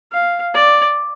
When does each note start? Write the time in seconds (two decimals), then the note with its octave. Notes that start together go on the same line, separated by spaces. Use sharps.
0.12 F5
0.54 D5